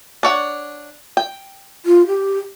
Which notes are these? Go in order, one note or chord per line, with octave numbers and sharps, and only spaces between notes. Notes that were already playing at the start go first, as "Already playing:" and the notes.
D4 C#5 F#5
G5
F4
G4